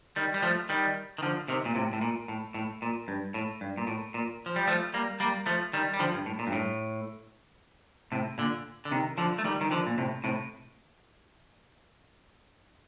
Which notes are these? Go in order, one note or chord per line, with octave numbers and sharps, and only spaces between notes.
D#3 G3
G3
F3 A3
D#3 G3
D#3
D3 F3
C3 D#3
A#2
A2 C3
A2
A#2
A2
A2
A#2
G2
A2
G2
A#2
A2
A#2
F3
G3
F3 A3
G3 A#3
G3 A#3
F3 A3
D#3 G3
G3
D3 F3
G2
A2
A#2
G2
A2
A2 C3
A#2 D3
D3
C3 D#3
D3 F3
A3
D#3 G3
D#3
D3 F3
A#2
A2 C3
A2 C3